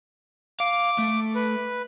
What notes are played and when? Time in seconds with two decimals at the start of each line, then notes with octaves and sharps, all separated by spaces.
0.60 F5 D6
0.98 A3
1.35 B4